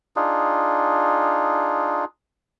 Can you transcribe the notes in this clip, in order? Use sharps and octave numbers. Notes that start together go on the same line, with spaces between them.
D4 D#4 F4 G#4